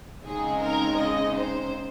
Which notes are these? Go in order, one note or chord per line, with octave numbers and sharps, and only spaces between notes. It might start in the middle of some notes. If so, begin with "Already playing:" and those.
C#3 G#3 C4 D#4 G#4
A#4
D#5
C5